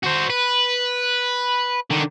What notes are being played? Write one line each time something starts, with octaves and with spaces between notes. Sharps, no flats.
F#4 C5
B4
D3 D#3